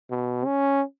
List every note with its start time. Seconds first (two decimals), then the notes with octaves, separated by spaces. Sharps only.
0.10 B2
0.45 C#4